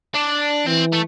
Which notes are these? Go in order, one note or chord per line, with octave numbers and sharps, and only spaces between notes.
D4
E3 C4
A3